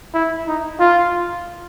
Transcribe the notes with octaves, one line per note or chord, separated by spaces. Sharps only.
E4
D#4
F4